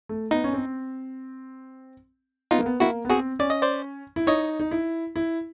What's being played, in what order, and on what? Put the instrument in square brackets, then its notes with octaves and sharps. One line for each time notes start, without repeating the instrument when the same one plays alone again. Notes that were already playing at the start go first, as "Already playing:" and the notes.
[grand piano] A3
[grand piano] B3 [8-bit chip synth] D#4
[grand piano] C#4
C4
[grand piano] B3 [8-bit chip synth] D#4 F4
[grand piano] A#3
B3
[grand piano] A#3 [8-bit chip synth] E4 F#4
[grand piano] B3
[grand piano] C4 [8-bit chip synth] F#4 G#4
[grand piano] C#4 [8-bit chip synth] D5
[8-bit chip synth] D#5
C5 D5
[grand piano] E4
[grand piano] D#4 [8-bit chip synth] C#5 D#5
[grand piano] D#4
E4
E4